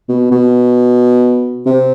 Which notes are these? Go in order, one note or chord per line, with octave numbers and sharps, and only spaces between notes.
B2
B2
C3